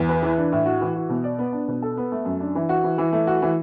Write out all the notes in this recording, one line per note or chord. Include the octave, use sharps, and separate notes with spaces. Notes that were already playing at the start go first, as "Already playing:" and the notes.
Already playing: E2
B4
E3
D4
A2
F#4
E3
F#4
B2
D5
B3
D4
B2
A4
B3
A3
F#2
D4
E3
F#4
E3
E3
A3
F#4
E3